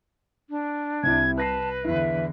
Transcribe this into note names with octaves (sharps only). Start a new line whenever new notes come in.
D4
C2 C3 E4 G#6
B4 A5 F#6 A#6 C7
E2 D3 E3 E4 E5